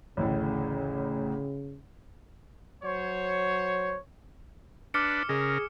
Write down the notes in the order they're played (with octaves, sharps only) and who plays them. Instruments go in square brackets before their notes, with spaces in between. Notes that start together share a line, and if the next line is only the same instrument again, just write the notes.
[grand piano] A1 D2 A2 [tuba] C#3
[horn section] F#3 C5 C#5
[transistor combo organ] D4 B4 [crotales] D6 F6 C#7
[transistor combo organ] C#3 A#4 [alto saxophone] G#4